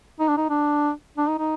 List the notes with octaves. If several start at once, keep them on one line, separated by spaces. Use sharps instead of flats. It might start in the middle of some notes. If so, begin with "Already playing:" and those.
D#4
D4
D#4
D4
D4
D#4
D#4